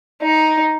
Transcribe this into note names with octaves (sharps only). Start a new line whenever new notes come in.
D#4